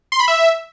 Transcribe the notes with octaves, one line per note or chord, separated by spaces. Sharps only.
C6
B5
E5